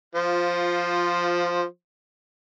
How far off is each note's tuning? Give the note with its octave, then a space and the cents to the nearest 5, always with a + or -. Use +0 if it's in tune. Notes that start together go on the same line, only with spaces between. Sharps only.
F3 +0 F4 +15 C5 +0